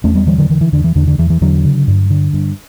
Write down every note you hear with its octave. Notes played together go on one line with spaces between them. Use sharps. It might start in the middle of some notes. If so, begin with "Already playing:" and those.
E2 A3 C#4
G3 B3
D3 E3 G3
D3 F#3
D3 E3
E3
E2 D3
E3
E2 D3
D3
E2 E3
E3
E2 D3 F#3
C#3
G2
D3
G2